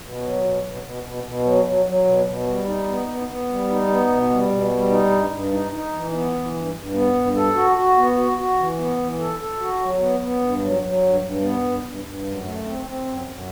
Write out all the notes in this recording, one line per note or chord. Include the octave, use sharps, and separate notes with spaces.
B2
F#3
B2
B2
B2
B2
B2
F#3
F#3
F#3
B2
B2
G3
D#4
B3
B3
B3
G3
D#4
B3
B2
G3
B2
G3
D#4
G2
G2
D#4
D#4
E3
B3
E3
G2
G2
B3
G2
A4
F#4
F#4
B3
F#4
F#4
E3
B3
E3
A4
A4
F#4
F#3
B3
B3
G2
F#3
F#3
G2
G2
B3
G2
G2
G2
F#2
A3
C4
C4
F#2
F#2